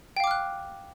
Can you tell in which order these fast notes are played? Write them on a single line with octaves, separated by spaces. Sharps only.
G5 F5 D6 F6 F#6